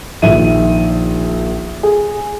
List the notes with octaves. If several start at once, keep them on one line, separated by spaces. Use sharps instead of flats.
A#1 D#3 E5 D#7
G#4